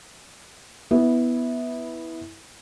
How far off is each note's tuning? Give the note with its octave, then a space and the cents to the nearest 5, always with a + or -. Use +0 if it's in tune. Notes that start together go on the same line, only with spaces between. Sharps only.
B3 +0 E4 -15